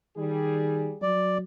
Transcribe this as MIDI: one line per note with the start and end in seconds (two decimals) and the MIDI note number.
0.17 0.89 51
0.17 0.99 55
0.17 0.99 68
1.02 1.43 54
1.02 1.38 74